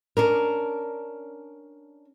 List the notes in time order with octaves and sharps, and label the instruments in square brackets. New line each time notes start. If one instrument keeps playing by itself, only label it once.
[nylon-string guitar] C#4 D4 A#4